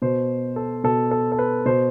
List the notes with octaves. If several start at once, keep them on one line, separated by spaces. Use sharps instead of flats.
B2 C5
A4
B2 A4
A4
A4
B4
B2 C5